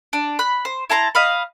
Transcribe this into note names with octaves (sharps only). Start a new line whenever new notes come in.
D4
B5 F#6
C5
E4 A5 A#5 C6
D#5 F5 B5